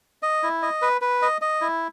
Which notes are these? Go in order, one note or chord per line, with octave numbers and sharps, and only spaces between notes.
D#5
E4
D#5
B4
B4
D#5
D#5
E4